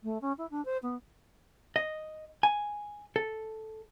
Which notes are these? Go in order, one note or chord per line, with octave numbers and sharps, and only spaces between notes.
A3
C#4
E4
D4
C5
B3
D#5
G#5
A4